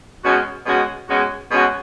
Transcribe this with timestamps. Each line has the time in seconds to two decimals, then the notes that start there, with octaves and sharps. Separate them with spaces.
0.24 B2 G#3 C#4 F#4
0.67 B2 G#3 C#4 F#4
1.09 B2 G#3 C#4 F#4
1.51 B2 G#3 C#4 F#4